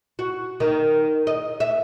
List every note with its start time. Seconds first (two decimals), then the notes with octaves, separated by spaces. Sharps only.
0.19 F#4
0.60 D#3
1.27 D#5
1.60 E5